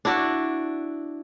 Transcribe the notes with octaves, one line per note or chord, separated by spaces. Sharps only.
D4 E4 F#4 D5